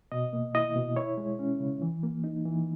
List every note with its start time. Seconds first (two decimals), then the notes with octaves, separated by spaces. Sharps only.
0.12 B2 D#5
0.33 A#3
0.55 E4 D#5
0.75 B2
0.96 E4 C#5
1.17 G#3
1.39 C#4
1.60 C#3
1.82 E3
2.03 A#3
2.24 D#4
2.45 E3